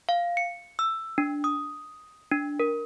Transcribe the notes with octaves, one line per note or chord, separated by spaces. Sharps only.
F5
C#7
E6
D4
D#6
D4
A#4